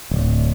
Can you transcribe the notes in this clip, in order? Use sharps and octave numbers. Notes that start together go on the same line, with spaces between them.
D1